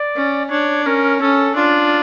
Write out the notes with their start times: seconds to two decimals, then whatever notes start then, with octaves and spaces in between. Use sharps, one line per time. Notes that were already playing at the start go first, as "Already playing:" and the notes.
Already playing: D5
0.15 C#4
0.50 D4 C#5
0.86 C#4 A#4
1.20 C#4 A4
1.55 D4 F4